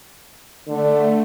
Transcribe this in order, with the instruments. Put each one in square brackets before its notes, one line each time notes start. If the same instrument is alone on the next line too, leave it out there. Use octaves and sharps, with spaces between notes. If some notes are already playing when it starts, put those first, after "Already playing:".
[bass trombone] D3 [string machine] A3